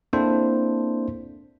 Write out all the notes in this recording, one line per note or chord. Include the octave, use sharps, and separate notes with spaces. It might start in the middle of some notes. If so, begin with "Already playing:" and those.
A#3 C4 D4 E4 A4 C5